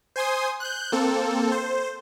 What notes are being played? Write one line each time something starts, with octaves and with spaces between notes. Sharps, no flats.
C5 G#5 C6 D#6
F#6 G6
A#3 C4 A4
C5